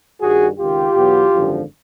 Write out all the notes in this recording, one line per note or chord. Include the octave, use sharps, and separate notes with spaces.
G2 D#3 G3 F#4 G#4
C#2 C3 D#3 F4 G4
E2 B2 F#3 B3
G#1 F#2 D3 F3